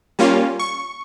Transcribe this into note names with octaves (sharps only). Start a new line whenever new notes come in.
G3 A#3 C#4 F4
C#6